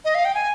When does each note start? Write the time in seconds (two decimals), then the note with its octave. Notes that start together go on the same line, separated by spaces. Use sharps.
0.05 D#5
0.15 F5
0.25 G5
0.34 G#5